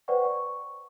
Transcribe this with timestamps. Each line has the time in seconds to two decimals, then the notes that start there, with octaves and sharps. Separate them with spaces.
0.08 B4 C5 D5 F#5 G5 C#6
0.25 C#6